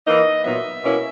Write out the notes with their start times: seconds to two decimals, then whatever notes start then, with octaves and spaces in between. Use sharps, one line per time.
0.07 E3 A#3 D#4 D#5
0.44 A#2 F#3 B3 D#4 E5
0.83 B2 A#3 C#4 E4